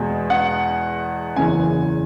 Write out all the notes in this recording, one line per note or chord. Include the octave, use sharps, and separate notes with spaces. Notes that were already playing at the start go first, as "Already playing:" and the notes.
Already playing: E2 B2 G#3
F#5
F#1 E2 C#3 E3 G#5